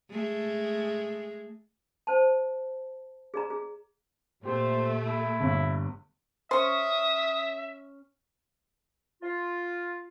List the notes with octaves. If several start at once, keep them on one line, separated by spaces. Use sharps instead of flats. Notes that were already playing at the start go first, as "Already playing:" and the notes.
G#3 A3
C5 A5
G#4 D5 A#5
G#4
A#2 A3 G4 C5
E4
G1 G2
C#4 C5 E5 C#6 D#6
F4